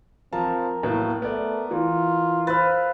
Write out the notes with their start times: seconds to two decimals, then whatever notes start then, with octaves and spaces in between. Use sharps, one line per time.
0.33 F3 C4 A#4 A5
0.83 A2 F#3 A#3 B3
1.22 A3 B3 D5
1.71 E3 F4
2.47 B4 C5 F5 E6 A6